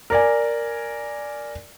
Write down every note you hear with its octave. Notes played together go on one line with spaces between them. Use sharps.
A#4 D5 G#5